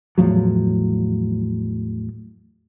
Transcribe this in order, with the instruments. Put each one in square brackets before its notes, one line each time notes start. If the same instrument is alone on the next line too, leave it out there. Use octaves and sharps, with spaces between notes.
[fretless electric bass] E2 A2 F3 F#3